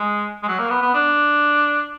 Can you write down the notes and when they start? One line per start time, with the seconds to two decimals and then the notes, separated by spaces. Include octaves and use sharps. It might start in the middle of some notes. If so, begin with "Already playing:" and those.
Already playing: G#3
0.43 G#3
0.48 F#3
0.59 A#3
0.70 B3
0.82 B3
0.94 D4